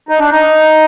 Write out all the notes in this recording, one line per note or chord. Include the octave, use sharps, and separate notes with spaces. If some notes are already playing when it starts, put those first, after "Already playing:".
D#4
D4
D#4